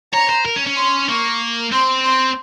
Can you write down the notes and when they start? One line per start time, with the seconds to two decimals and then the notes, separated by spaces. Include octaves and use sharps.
0.13 C#5 A#5
0.30 C5
0.46 A#4
0.56 C#4
0.67 C#4
0.77 C6
1.08 A#3 C#6
1.72 C4 C6
2.04 C6